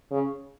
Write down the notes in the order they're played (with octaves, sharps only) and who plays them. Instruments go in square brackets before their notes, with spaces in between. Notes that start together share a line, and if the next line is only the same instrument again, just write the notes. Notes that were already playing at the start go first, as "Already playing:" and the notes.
[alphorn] C#3